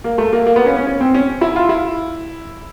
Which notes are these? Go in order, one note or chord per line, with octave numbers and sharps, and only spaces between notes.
A#3
A3
A#3
A#3
B3
C#4
C#4
C#4
C4
C#4
E4
F4
E4